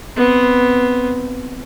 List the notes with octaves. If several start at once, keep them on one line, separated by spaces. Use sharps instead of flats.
B3 C4